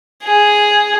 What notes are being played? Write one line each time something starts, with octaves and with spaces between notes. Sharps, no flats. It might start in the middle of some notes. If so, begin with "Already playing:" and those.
G#4